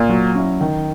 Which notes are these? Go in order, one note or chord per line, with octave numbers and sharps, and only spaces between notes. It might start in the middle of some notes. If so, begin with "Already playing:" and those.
Already playing: A#2
F#3
C#4 E4
D#3